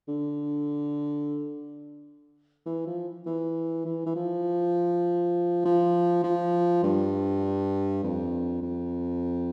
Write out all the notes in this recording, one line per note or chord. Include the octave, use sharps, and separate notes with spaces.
D3
E3
F3
E3
E3
E3
F3
F3
F3
G2
F2
F2